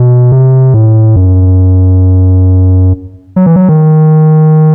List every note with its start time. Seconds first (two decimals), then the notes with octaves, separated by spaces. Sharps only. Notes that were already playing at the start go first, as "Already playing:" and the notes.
Already playing: B2
0.32 C3
0.74 A2
1.16 F#2
3.36 F#3
3.46 E3
3.56 F#3
3.69 D#3